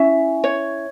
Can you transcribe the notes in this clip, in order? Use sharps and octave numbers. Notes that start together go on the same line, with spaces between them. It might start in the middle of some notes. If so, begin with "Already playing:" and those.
Already playing: C#4 E4 E5 G#5
C#5